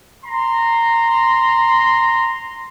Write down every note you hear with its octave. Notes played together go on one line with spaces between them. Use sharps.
A#5 C6